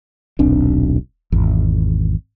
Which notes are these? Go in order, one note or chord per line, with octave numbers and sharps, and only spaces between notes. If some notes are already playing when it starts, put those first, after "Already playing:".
D#1 B1 C4 D4
G#1 E2